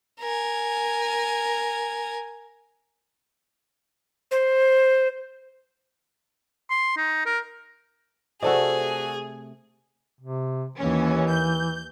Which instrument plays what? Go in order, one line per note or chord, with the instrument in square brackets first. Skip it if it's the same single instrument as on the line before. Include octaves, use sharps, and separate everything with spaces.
[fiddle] A#4 G#5
[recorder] C5
[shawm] C6
D#4
A#4
[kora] C3 A3 [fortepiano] F#4 A4 D5 [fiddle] G#4
[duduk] C3
[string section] D#2 C#4 [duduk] E3
[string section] G6